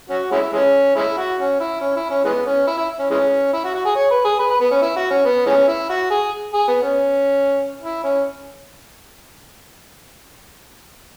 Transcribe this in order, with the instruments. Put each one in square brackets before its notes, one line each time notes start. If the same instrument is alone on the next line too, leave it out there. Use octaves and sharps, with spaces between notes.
[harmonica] C#4 F#4
G#3 C#4 E4
E3 G#3 C#4
G#3 C#4 E4
F#4
C#4
E4
C#4
E4
C#4
E3 G#3 B3
C#4
E4
E4
C#4
E3 G#3 C#4
E4
F#4
F#4
G#4
C#5
B4
G#4
B4
B4
B3
C#4
E4
F#4
C#4
B3
E3 G#3 C#4
E4
F#4
G#4
G#4
B3
C#4
E4
C#4